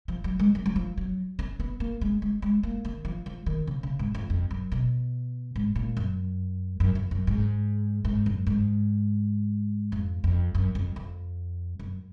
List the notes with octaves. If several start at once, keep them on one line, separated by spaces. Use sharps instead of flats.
F3
F#3
G#3
F#3
F#3
F3
F#3
C#4
B3
A#3
G#3
G#3
G#3
A#3
D#3
F3
F3
D#3
C#3
C#3
G#2
F2
F2
F#2
B2
G#2
A#2
F#2
F#2
F2
F#2
G#2
G#2
F#2
G#2
F2
F2
F#2
F2
F2
F#2